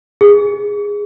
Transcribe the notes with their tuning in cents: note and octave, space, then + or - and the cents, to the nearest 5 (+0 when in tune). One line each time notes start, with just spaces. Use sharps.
G#4 -20